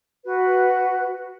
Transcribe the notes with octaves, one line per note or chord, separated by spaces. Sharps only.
F#4 B4